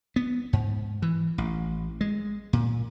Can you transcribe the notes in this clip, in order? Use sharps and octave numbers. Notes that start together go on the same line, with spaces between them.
B3
G#2
E3
A1
G#3
A#2